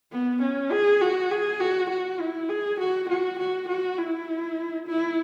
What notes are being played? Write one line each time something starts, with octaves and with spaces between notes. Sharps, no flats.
B3
C#4
G#4
F#4
G#4
F#4
F#4
E4
G#4
F#4
F#4
F#4
F#4
E4
E4